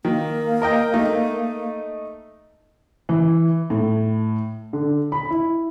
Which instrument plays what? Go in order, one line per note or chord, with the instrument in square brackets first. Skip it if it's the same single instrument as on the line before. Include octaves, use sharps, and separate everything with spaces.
[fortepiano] D#3 [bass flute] A#3
[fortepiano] A#4 D#5 G5
A3 D#4
[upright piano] E3
A2
D3
B5
E4